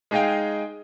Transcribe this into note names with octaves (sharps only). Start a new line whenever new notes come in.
G#3 D#4 G#4 D#5 F5 G5